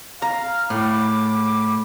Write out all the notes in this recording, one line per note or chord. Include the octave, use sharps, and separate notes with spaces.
F5 A#5
A2 B5 D6